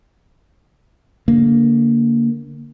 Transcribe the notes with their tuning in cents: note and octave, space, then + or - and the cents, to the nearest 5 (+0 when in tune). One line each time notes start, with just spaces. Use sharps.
D3 -25 A#3 +0